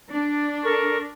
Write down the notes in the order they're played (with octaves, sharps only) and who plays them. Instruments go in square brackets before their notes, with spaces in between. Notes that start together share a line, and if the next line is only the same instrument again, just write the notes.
[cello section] D4
[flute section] A4 A#4 C#6